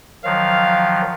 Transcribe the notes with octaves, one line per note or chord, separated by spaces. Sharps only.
D#3 F3 F#3 F5